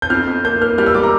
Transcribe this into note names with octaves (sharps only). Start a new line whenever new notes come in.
G6
F2 F6
F2
A#3 G6
A#3 F6
G3 F6
E6
G3 D6
A#5